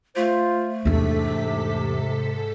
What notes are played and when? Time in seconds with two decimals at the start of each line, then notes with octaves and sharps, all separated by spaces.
0.16 A3 F4 C5
0.85 E2 G#2 C3 D4 A4 B6